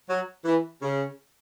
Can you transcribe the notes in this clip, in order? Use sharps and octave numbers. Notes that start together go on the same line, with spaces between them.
F#3
E3
C#3